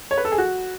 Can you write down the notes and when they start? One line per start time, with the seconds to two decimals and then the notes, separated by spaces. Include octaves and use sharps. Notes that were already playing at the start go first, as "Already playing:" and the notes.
0.11 C#5
0.17 B4
0.25 A4
0.32 G#4
0.38 F#4